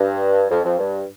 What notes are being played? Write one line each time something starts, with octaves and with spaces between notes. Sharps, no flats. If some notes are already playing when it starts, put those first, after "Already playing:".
Already playing: G2
F2
F2
G2